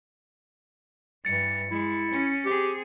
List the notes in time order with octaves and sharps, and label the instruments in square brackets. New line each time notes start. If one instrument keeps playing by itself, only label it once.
[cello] G2 E3 [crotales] A6 C#7
[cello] G#3 [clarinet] E4
[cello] C#4
[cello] C4 G#4 [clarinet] G4